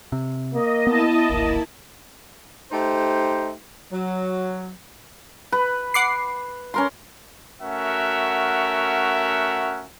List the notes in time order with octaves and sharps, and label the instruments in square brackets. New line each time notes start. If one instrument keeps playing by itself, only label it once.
[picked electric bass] C3
[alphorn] A#3 [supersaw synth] D#5
[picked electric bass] B3 [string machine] E4 A5
[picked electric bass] D1 G#1 [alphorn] A#3
[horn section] A3 D#4 G4 C5
F#3
[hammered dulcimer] B4
[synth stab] F#5 D6 C7
[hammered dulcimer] C#4 A#4 C6
[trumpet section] A3 C#4 F#4 A#4 E5 F#5